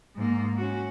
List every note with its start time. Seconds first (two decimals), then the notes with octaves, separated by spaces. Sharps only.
0.16 G#2 A#3
0.57 C#4 F#4